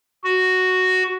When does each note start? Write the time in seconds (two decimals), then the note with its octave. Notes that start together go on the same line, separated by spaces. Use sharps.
0.24 F#4